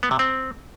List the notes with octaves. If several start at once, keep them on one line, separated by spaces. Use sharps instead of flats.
B3
C3
C4